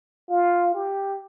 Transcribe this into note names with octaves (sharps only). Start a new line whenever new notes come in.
F4
G4